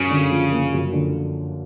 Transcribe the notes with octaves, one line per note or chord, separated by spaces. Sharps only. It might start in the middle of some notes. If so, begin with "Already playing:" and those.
Already playing: F#2 C#3
D3
F3
A#3
F#2
D3